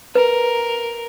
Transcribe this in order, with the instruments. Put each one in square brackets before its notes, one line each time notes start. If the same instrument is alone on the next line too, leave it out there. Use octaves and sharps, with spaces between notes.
[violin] A#4 [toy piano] B4